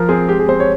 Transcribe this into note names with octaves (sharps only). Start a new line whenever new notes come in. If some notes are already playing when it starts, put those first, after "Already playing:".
Already playing: F3 A#4
C4 G#4
G#3 G4
G#4
C4 C5
C#5